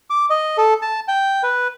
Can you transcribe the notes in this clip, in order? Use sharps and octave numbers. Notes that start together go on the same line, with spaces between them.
D6
D#5
A4
A5
G5
B4